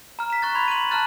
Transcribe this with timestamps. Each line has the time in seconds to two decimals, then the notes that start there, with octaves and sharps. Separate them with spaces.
0.19 A#5 F6
0.30 B6 E7
0.42 C#6 F#6 A6
0.55 B5 C6 G#6
0.68 D#7 F#7
0.91 A5 A#5 F6 F#6 A6